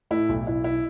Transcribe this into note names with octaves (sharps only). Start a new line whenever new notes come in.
A2 E4
B1
B1 E4
E4